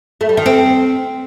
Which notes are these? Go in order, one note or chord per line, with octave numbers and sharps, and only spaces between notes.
A3
G3
D#3
C4